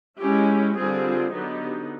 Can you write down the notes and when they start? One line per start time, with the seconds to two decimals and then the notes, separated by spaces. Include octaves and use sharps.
0.19 G#3 C#4 E4 G4
0.76 D3 G3 C4 F4 G#4
1.32 D3 F#3 B3 D#4 G4